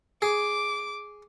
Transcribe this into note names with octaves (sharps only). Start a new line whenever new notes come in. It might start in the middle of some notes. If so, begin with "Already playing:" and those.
G#4 D6